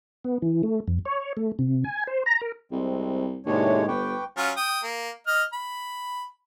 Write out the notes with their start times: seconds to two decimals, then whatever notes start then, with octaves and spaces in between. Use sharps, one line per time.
0.25 B3
0.42 E3
0.63 A3
0.88 F2
1.05 C#5
1.37 A3
1.59 C3
1.84 G#5
2.07 C5
2.26 A#5
2.41 A#4
2.72 C2 G#3 C4
3.46 D#2 A2 C3 G#3 D4 C#5
3.88 G1 B4 G5 C#6 D6
4.37 F#3 C#4 F4
4.57 G5 D#6
4.83 A#3
5.27 D#5 F6
5.53 B5